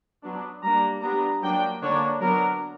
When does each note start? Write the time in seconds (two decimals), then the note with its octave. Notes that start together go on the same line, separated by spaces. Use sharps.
0.23 F#3 B3 D4
0.63 G3 A#3 D4 A#5
1.03 G3 B3 D4 A#5
1.42 F#3 A#3 D4 G5
1.81 D3 A#3 D4 C#5
2.21 F#3 B3 D4 A#4